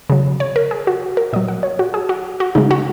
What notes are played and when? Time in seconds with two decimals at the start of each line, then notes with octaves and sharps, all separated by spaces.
0.10 C#3 F#3
0.40 C#5
0.56 A#4
0.71 G#4
0.87 F#4
1.17 A#4
1.33 A#2 D#5
1.36 F#3
1.48 F#5
1.63 C#5
1.79 F#4
1.94 G#4
2.09 F#4
2.40 F#4
2.55 C#3 G#3 D#4
2.71 F#4